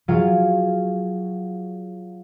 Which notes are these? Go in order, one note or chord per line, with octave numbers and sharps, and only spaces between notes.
F#3 F4 G#4 F5